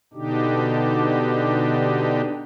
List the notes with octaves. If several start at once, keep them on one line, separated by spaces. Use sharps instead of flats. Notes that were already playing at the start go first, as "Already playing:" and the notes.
B2 D3 D4 D#4 G4